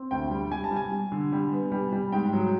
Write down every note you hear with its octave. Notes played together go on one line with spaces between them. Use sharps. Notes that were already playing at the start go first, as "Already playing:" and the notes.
Already playing: C4
D2 G5
G3
G3 G#5
A5
G3
G#5
G3
D3
G3
B3
G3
G3
G#2 G5
F#3